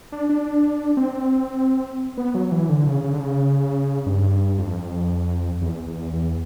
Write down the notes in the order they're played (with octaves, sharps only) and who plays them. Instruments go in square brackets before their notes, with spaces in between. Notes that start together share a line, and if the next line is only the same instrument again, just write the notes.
[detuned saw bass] D4
D4
C4
B3
F#3
E3
D3
C#3
C#3
D3
C#3
G2
F2
E2
E2
E2